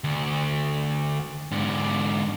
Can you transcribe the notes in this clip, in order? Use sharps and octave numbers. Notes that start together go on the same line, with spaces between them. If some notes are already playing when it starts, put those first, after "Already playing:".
D2
G#2 D3